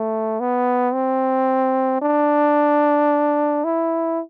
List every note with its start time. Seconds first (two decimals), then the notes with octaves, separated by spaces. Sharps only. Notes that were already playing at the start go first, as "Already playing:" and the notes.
Already playing: A3
0.40 B3
0.94 C4
2.02 D4
3.64 E4